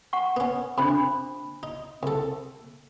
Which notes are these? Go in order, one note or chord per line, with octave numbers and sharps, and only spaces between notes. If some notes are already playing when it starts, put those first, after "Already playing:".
F#5 C#6
B3 C#4
F2 C3 D4 C5 B5
D#4
C2 A4